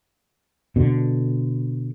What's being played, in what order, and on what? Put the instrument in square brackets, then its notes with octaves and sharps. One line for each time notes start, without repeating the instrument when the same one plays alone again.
[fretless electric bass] B2 D3